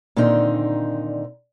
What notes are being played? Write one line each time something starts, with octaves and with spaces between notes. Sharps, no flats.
A#2 D3 D#3 C4 D#4